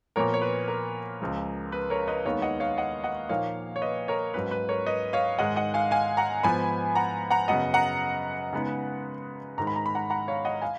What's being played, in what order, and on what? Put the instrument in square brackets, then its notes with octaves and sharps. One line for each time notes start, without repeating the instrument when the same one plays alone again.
[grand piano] A#2 F3 B3 A#4 C#5
C#5
B4
A#4
C#2 C#3 F3 G#3
B4
A#4 C#5
B4 D#5
D#2 D#3 G#3 B3 D#4 C#5 F5
D#5 F#5
C#5 F5
D#5 F#5
D#5 F#5
A#2 F3 A#3 D#4 C#5 F5
C#5
B4 D#5
A#4 C#5
G#2 F#3 C#4 B4
B4
A#4 C#5
B4 D#5
C#5 F5
G#2 D#3 G#3 D#4 D#5 F#5
D#5 F#5
F5 G#5
F5 G#5
F#5 A#5
G#2 F3 B3 G#5 B5
F#5 A#5
F#5 A#5
F#2 C#3 F#3 B3 D#5 F#5
F#5 A#5
C#3 G#3 B3 D#4
G#2 D#3 G#3 A#5
B5
A#5
B5
F#5 A#5
F#5 A#5
C#5 F5
D#5 F#5
F5 G#5